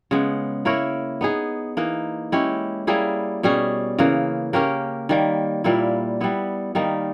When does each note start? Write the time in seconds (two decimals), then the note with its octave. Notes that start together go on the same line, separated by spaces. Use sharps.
0.11 C#3 G#3 B3
0.65 A#3 E4 A#4 C#5
1.21 B3 D#4 G#4
1.77 E3 A#3 D#4
2.32 G#3 C#4 E4 G4
2.87 G3 A#3 E4 G#4
3.43 B2 G3 C#4 G#4
3.99 C#3 E3 A#3
4.53 A#3 C#4 G4 A#4
5.09 D#3 G3 A#3
5.64 A#2 G3 A#3 E4
6.21 G3 B3 E4
6.75 D#3 G3 A#3 D#4